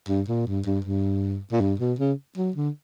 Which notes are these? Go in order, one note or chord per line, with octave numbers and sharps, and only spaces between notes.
G2
A#2
G2
G2
G2
A#2
G2
B2
C#3
F#3
D3